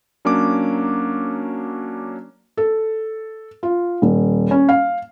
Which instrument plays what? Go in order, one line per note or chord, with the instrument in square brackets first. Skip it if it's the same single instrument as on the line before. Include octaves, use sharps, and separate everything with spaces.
[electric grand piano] F#3 A#3 C#4 D4 C#5 D6
[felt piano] A4
F4
D#1
C#4
F5